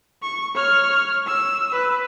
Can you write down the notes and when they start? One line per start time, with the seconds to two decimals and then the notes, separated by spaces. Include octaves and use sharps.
0.22 C#6
0.55 C#5 F6
1.27 E6
1.72 B4